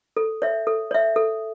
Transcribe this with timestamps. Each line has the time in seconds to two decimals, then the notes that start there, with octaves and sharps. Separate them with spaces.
0.17 A4
0.42 C#5 E5
0.67 A4
0.91 C#5 E5
1.16 A4